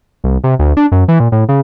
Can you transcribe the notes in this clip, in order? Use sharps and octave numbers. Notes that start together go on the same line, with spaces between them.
C2
C3
D2
D4
F#2
E3
A#2
A2
C#3